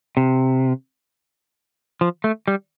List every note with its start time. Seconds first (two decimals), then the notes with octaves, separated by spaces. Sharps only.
0.17 C3
2.01 F3
2.24 A3
2.48 G3